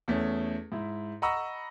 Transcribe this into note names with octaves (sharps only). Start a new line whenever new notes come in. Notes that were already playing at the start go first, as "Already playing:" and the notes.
E2 A3 C#4
G#2 E4
D#5 F#5 A#5 B5 C#6 E6